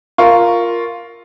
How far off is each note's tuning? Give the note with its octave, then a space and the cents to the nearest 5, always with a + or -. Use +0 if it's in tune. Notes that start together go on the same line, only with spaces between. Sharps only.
F4 +0 A#4 +0 C#6 +0